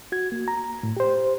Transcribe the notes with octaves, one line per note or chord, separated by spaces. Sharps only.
F#4 G#6
A#3
A#5
A2
G4 C5